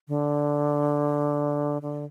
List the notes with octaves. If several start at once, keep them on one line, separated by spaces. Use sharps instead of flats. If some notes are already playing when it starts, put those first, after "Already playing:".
D3
D3